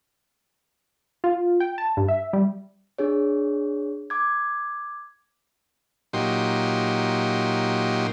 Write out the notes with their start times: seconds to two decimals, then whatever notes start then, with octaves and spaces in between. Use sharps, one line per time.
1.24 F4
1.60 G5
1.78 A5
1.97 G2
2.08 E5
2.33 G3
2.98 D4 G#4 C#5
4.10 D6 G#6
6.13 A#2 F#3 D#4 G4 C6